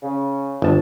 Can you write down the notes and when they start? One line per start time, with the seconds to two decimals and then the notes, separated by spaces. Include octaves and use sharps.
0.03 C#3
0.62 G1 A5